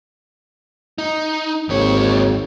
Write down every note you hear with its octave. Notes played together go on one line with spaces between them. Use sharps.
D#4
G#1 D#2 C#5